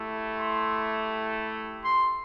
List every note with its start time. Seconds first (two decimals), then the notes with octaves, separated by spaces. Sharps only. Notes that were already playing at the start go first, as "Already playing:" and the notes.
Already playing: A3 E4 G4
0.38 C6
1.85 C6